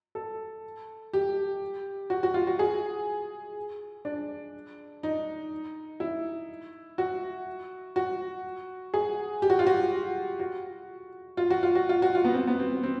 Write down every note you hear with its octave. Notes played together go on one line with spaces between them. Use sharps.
A4
G4
F#4
F#4
F4
F#4
G#4
D4
D#4
E4
F#4
F#4
G#4
G4
F#4
F4
F#4
F#4
F4
F#4
F4
F#4
F4
F#4
F4
B3
C4
B3
C4
C4